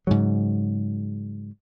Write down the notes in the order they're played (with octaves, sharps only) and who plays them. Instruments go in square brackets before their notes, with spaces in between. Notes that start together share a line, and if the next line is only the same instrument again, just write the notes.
[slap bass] G#2 C#3 F#3